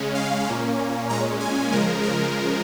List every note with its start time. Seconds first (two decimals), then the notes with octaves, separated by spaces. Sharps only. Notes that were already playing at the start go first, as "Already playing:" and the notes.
Already playing: C#3 G#3 C#4
0.15 F5
0.47 A#2 A#3 C#4
1.09 A#2 G#3 C#4 A#5
1.40 G#5
1.72 C#3 F3 G#3 A#4
2.04 A#4